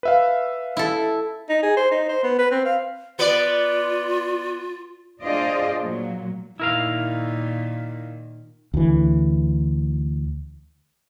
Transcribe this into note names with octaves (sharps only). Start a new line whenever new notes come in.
B4 E5 F5
E4 A4
D#4
G#4
C5
D#4
C5
B3
B4
C4
F5
B3 F4 B4 D5
D4 F4 G#4 C5 D5 D#5
A#2 F#3
A#2 D#3 E4 A#4 F5
D2 E3